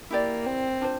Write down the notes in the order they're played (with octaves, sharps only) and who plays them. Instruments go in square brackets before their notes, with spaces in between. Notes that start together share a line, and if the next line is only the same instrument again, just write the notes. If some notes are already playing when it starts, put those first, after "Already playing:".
[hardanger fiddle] A#3 [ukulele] E4 G4 D5
[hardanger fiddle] C4
[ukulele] D4 F4 C5